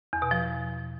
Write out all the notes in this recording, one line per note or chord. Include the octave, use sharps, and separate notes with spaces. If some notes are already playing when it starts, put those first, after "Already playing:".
E2
B2
F3